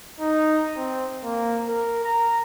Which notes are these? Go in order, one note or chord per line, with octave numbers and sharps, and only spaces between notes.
D#4
C4
A#3
A#4
A#5